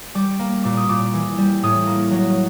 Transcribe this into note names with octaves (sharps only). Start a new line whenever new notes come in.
G3 D6
A#3
A#2 D6
D#6
A#2 D6
E3
G3
A2 D#6
A#3
F#3